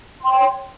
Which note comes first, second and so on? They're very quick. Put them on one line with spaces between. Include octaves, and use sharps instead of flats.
C6 G5 C#5